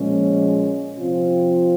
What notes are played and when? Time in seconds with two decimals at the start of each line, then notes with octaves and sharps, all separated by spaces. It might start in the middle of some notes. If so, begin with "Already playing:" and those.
Already playing: A#2 F3 G#3 C#4
0.98 C3 F3 C4 F4